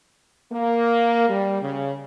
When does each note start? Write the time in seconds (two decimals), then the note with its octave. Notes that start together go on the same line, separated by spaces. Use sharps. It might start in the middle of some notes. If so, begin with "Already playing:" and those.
0.52 A#3
1.29 G3
1.62 C#3